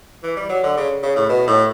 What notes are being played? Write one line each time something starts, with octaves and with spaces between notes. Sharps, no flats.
E3
G3
F#3
D3
C#3
C#3
A2
B2
A2